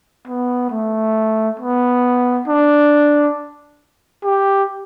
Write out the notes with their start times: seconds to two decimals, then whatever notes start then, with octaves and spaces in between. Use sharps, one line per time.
0.28 B3
0.70 A3
1.60 B3
2.48 D4
4.24 G4